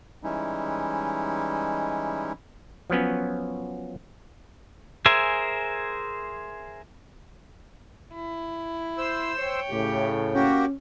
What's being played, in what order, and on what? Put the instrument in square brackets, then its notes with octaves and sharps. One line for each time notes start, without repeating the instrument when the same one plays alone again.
[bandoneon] E3 G3 G#3 C#4 D#4 E4
[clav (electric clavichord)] F3 F#3 B3 C#4
[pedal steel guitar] G#4 A#4 C5 E5 G#5
[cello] E4
[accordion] C5 E6
[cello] C#5 G5
[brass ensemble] A2 C#3 [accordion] G4
[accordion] A#3 F#4 G4 [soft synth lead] C#4